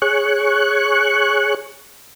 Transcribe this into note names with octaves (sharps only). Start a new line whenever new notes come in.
G#4 C#5 C#6 F#6